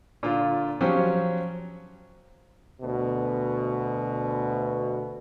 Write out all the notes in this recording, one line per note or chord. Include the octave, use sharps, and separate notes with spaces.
A#2 D3 F4
F3 F#3 C#4 G4 C5
D2 B2